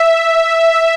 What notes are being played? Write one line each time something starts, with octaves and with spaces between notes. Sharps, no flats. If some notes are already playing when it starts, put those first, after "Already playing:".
Already playing: E5